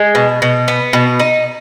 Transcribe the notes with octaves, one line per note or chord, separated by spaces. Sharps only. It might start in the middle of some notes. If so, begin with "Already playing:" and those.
Already playing: G#3
B2
B2
B3
B2
D#4